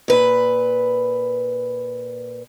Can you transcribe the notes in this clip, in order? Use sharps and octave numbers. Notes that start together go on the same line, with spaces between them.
A#2 B4